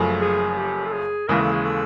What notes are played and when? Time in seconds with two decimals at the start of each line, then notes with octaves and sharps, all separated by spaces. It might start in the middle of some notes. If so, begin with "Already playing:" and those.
Already playing: F#1 F#2 C#3 F3 A3
0.21 G#4
0.57 G4
0.86 A4
0.92 G#4
1.28 D#2 C#3 E3 G#3 A#4
1.41 A4
1.52 G#4
1.65 A4